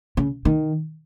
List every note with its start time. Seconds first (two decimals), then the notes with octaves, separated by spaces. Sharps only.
0.17 C#3
0.45 D#3